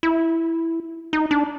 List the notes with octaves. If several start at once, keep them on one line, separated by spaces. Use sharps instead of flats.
E4
D#4
D4